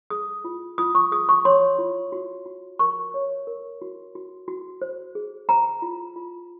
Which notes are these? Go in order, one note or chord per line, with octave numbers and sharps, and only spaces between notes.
G#4 D#6
F4
F4 D#6
C#6
G#4 D#6
C#6
C#5 C6
F4
F#4
F#4
A#4 C#6
C#5
A#4
F#4
F#4
F#4
C5
G#4
C5 A#5
F4
F4